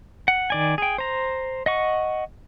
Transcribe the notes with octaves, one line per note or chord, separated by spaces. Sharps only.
F#5
D#3 D5 G#5
G#4 G5
C5 A#5
D#5 F#5 C#6